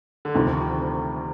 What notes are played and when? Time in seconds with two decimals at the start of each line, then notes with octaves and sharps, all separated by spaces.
0.25 D3
0.35 D2 C3 D#3 F3